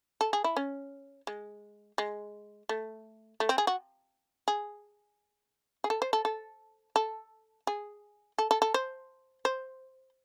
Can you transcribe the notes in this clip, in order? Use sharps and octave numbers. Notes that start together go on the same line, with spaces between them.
A4
G#4
E4
C#4
G#3
G#3
A3
A3
C4
G#4
F#4
G#4
G#4
A4
C5
A4
A4
A4
G#4
A4
A4
A4
C5
C5